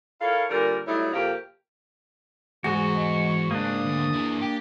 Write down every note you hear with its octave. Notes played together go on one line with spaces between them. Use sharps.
E4 A4 A#4 C#5 F5
A#2 D3 G3 A#4
F#3 G3 A3 D#4 E4 C#5
F2 C3 A#3 G4 A#4
E2 G#2 F#4 G#4 G#5
G#3
C#2 A#3 D4 D#6
D2
E4 G#4
G4